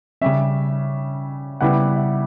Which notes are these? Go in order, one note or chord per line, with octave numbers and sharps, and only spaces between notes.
C#3 G3 C#4 E5
C#3 G3 B3 E4 F#5
E5